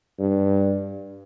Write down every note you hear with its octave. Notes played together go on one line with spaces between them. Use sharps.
G2